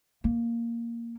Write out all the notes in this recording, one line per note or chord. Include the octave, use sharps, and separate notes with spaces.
A#3